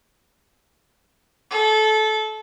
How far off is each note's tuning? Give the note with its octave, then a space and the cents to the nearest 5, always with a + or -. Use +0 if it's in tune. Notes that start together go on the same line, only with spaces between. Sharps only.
A4 -25